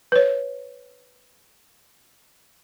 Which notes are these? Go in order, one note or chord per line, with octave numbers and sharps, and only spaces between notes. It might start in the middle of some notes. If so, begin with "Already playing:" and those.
B4 C#5